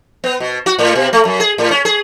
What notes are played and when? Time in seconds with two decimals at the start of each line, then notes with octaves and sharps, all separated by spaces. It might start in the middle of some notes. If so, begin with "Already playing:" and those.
0.24 B3
0.40 B2
0.66 F#4
0.79 A2
0.95 B2
1.13 A3
1.25 F#2
1.40 G#4
1.58 A2
1.71 C#4
1.85 G#4